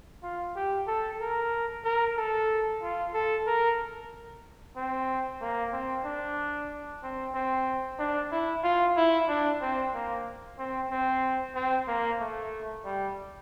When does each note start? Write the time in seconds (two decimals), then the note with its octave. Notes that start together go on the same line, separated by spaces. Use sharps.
0.23 F4
0.55 G4
0.87 A4
1.21 A#4
1.84 A#4
2.17 A4
2.82 F4
3.14 A4
3.47 A#4
4.76 C4
5.41 A#3
5.73 C4
6.05 D4
7.03 C4
7.34 C4
7.99 D4
8.31 E4
8.63 F4
8.97 E4
9.28 D4
9.62 C4
9.94 A#3
10.58 C4
10.91 C4
11.55 C4
11.88 A#3
12.20 A3
12.85 G3